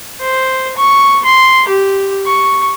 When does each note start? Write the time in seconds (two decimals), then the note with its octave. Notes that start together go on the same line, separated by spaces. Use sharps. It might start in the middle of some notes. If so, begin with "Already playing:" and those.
0.21 C5
0.77 C#6
1.25 C6
1.68 G4
2.26 C#6